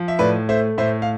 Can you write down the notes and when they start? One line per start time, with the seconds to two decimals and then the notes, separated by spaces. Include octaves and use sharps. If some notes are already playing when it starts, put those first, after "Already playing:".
Already playing: F3
0.08 E5
0.19 A2 B4 D5
0.49 A3 C5 E5
0.78 A2 C5 E5
1.02 F5